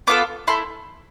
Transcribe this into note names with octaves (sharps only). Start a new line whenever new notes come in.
B3 F4 A4 D6
A3 E4 A4 C6